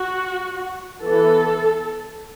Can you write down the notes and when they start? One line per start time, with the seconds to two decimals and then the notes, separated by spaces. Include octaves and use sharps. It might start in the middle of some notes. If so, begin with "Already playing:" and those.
Already playing: F#4
1.02 E3 B3 A4